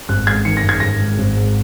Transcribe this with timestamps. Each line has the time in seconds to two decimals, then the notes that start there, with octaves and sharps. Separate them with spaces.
0.09 G#1 F#6
0.27 G#2 G#6
0.45 D#3 C#7
0.57 A#6
0.63 G#1
0.69 G#6
0.80 G#1 A#6
1.00 G#2
1.18 G#1
1.36 G#2